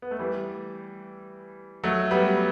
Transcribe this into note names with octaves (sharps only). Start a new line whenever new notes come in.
B3
A3
E3 G3
F#3 A3
G3 B3